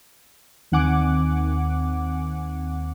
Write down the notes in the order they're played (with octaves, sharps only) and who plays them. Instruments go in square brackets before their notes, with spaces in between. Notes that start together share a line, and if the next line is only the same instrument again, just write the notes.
[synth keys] D#2 D#3 C4 F#5 G#5 D6